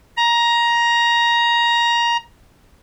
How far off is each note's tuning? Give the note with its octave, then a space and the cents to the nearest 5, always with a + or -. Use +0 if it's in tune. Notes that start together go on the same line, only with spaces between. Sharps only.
A#5 +15